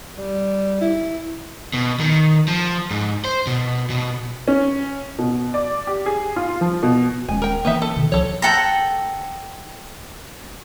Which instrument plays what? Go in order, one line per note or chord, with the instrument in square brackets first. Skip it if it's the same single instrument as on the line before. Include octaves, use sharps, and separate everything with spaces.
[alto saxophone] G3
E4
[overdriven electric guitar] B2
D#3
F3
G#2
C5
B2
B2
[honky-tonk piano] C#4
B2
D5
G4
G#4
F4
F3
B2
[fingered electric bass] D#1 G#3 C#4 [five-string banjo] G#5
[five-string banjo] A#4 G5
[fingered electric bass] E3 A#3 [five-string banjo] B3 D#4 E5
[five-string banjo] A4
[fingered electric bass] B2 D3 D#3
[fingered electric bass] C#2 F3 [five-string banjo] A4 C#5
[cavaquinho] A4 F#5 G5 A#5